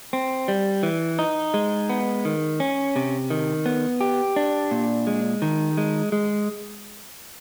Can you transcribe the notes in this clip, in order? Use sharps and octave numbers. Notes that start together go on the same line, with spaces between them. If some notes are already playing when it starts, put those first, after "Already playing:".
C4
G3
E3
D#4
G#3
B3
D#3
C#4
C3
D#3
B3
G4
D4
A#2
G#3
D#3
G#3
G#3